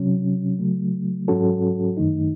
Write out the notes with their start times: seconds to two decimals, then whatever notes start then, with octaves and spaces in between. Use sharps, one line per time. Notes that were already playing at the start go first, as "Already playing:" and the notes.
Already playing: C3 F#3 C#4
0.59 C#3 F#3 A3
1.28 G#2 F#3 C#4 F#4 A4
1.97 F#2 D#3 A3 D#4